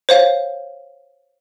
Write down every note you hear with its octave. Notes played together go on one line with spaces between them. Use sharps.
C5 C#5 F5